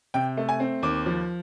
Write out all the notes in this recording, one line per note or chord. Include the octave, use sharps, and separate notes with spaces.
C3 G5
A3
G#5
C4
D#2 D6
F3